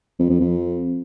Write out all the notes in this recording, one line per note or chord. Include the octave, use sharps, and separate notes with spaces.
F2
F2
F2